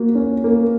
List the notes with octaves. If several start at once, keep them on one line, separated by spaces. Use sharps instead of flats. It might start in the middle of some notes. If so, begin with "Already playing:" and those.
Already playing: A#3 F#4
C#4
A#3